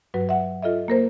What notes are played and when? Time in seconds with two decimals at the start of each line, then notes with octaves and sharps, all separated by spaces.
0.14 G2 F#3 F#4 B4
0.29 E5 F#5
0.62 F4 A4 D#5 E5
0.88 A#3 A#4 C5